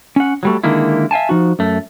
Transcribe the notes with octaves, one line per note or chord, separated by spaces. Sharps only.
C#4 F#5
F#3 G3 A3
D3 D#3 G#3 A#3 E4
E5 F5 G#5 A5
F3 D#4 F#4
F#2 A3